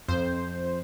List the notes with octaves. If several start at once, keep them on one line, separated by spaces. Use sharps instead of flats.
F2 C5